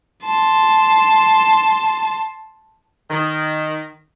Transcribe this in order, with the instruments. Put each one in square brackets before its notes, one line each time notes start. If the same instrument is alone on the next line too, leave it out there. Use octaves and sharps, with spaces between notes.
[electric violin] A5 C6
[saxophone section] D#3